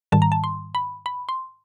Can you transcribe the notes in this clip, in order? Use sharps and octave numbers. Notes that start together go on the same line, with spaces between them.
G#2 D#3 G3 A5
A#5
A5
C6
B5
B5
C6